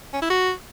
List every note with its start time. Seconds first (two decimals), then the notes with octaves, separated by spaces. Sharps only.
0.13 C#4
0.22 E4
0.30 F#4